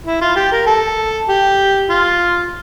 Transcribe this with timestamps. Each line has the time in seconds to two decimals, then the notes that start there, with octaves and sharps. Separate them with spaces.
0.07 E4
0.21 F4
0.36 G4
0.52 A#4
0.67 A4
1.29 G4
1.90 F4